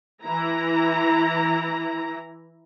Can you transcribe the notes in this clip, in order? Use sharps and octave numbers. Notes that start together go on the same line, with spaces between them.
E3 E4 A#5